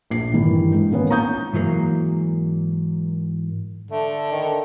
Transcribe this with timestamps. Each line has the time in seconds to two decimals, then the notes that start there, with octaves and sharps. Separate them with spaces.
0.10 A#1 C7
0.33 G2 D#3 E3
0.74 G#2
0.91 D#3 A#3 B3 C#4
1.10 A#5 C#6 D#6 G6
1.53 G#2 E3 F#3 A#3
3.91 D3 A3
4.32 D#3